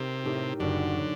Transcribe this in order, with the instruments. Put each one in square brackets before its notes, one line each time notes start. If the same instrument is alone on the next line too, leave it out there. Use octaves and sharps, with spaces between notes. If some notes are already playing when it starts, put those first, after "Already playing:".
Already playing: [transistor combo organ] C3 [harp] D#4 G4 A#4
[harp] A2 A3 D#4 G4 A#4
[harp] F#1 F#2 F#3 [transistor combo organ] D3
[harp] F#3